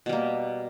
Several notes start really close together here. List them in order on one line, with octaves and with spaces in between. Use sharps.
B2 G3 A#3